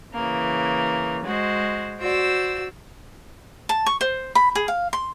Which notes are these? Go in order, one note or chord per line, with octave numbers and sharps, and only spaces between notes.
C#3 E3 A#3
G#3 F#4 C5
F#4 C5 D5 E6
A5
C#6
C5
B5
G#4
F5
C6